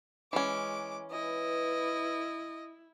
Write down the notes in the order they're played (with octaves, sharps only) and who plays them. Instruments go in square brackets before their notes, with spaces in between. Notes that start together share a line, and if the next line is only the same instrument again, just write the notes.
[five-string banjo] E3 C#4 [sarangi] G#3 [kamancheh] D6
[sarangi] E4 [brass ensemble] B4 [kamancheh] D#5